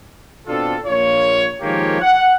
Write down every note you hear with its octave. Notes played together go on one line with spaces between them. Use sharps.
B2 C4 D4 F4 A4
A#1 A#3 F4 C#5
D#3 F3 G#3 A#3 G4 C#5
F#5